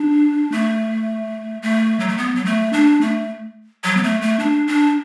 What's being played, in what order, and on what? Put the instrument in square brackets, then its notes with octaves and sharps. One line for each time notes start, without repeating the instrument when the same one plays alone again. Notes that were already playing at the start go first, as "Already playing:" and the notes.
Already playing: [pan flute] D4
A3
A3
F#3
A3
B3
F#3
A3
D4
A3
F#3
B3
A3
A3
D4
D4